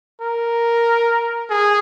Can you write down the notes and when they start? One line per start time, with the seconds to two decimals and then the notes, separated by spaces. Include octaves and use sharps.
0.21 A#4
1.50 G#4